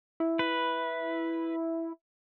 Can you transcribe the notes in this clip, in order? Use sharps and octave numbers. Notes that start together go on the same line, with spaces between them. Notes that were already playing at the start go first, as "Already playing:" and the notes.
E4
B4